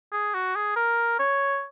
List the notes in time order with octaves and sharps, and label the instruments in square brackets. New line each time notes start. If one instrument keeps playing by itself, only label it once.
[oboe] G#4
F#4
G#4
A#4
C#5